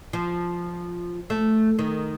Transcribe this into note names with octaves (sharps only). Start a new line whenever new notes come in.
F3
A3
D#3